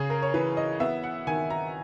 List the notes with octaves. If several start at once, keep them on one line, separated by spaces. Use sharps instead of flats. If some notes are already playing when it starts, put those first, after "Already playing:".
Already playing: C#3 G#4
A#4
C#5
E3 B4
D#5
B3 E5
F#5
D#3 G#5
A#5